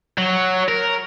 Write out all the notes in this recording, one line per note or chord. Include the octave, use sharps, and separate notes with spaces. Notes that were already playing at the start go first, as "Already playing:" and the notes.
F#3
A#4